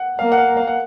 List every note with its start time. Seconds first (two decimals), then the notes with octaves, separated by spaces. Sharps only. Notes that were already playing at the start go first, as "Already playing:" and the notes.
Already playing: F#5
0.19 A#3 F5
0.32 F#5
0.37 F5
0.57 F5
0.68 F#5